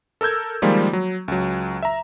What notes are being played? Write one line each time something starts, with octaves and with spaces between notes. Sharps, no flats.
A4 A#4 E6 G6 G#6
D#3 F3 G3 G#3 A#3 F4
F#3
C#2 F#3
E5 A#5